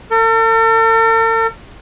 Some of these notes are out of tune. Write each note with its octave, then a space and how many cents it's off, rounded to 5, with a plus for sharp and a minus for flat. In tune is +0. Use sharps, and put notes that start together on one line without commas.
A4 +45